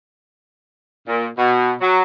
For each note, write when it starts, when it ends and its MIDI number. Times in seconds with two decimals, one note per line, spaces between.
1.07 1.27 46
1.37 1.72 47
1.81 2.02 54